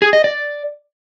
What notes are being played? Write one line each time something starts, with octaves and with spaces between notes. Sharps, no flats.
G#4
D#5
D5